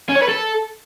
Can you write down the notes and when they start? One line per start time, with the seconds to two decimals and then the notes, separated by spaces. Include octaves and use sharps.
0.09 C#4
0.16 C#5
0.22 B4
0.29 A4